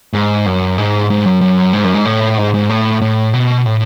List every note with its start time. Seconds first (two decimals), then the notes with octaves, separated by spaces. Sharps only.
0.13 G#2
0.46 F#2
0.78 G#2
1.10 G#2
1.25 F#2
1.41 F#2
1.73 G#2
1.84 F#2
1.94 G#2
2.05 A2
2.37 G#2
2.54 G#2
2.69 A2
3.01 A2
3.33 B2
3.66 A2